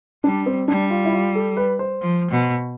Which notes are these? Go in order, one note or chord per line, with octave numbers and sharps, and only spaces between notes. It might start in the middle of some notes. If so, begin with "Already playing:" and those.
G3 D4
C4
G3 D4
F4
E4
F4
A4
B4
C5
F3
B2